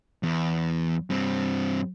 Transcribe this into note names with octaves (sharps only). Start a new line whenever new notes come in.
E2
G2 C4